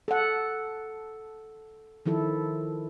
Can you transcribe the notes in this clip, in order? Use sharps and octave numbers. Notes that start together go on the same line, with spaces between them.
A4 F#5
D#3 F3 E4 A4